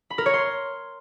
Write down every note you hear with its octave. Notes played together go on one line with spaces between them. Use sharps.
B5
A#4
C#5
C6